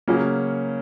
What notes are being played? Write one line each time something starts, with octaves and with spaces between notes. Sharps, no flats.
C#3 F#3 A#3 C#4